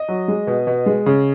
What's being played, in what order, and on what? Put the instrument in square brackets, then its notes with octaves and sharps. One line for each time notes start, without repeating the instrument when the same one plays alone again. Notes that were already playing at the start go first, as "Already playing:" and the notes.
Already playing: [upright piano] D#5
F#3
G#3
B2
B2
G#3
C#3